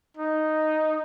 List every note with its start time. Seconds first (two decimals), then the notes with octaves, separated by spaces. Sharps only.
0.17 D#4